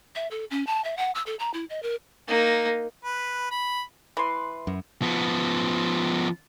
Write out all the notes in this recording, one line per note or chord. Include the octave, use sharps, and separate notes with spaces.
E5
A4
C#4
A5
E5
F#5
E6
A4
A#5
E4
D#5
A#4
A#3 D#4
B4
B5
E3 B4 C6
F#2
F3 B3